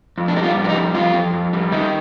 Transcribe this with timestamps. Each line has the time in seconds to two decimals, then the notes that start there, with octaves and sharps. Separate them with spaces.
0.18 F2
0.28 D4
0.36 G3 D#4
0.43 F4
0.57 F2
0.64 D4
0.69 D#4
0.75 G3
0.95 F2 F4
1.14 F2
1.33 F2
1.53 G3
1.72 D#3 D#4